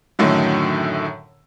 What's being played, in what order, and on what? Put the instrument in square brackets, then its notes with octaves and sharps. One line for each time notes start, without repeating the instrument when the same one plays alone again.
[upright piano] F#2 A2 D3 D#3 F#3